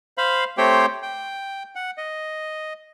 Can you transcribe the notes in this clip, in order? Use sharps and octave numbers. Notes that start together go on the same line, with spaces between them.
C5 F5 B5
A3 C4 G4 C5 C#5 G5
G5
F#5
D#5